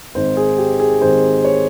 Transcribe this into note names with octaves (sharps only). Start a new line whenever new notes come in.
G#1 G#2 D#3 C5
G#4
G4
G#4
G#1 G#2 D#3 C5
C#5